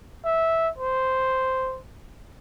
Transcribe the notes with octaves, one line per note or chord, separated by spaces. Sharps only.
E5
C5